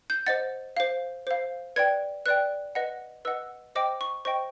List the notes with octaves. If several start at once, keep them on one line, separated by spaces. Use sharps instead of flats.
G6
C5 D#5 F#5 A6
C5 F5
C5 F5
B4 D5 G5 G#6
B4 D5 G5 F#6
B4 D#5 F#5
B4 D#5 F#5 E6
C5 D#5 G5 D6
C#6
C5 D#5 G5 C#6